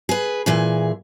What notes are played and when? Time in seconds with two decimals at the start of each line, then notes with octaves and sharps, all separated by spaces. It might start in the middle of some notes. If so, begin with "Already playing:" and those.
0.09 G#4 B4
0.46 A#2 E3 G#4